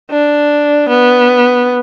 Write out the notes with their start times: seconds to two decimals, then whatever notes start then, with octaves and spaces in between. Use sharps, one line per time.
0.11 D4
0.89 B3